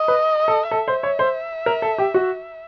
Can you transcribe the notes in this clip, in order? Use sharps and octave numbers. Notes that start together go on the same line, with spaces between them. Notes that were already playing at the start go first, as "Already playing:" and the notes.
Already playing: D#5
B4
A4
A4 E5
C5
C#5
C5
A#4
A4
G4
F#4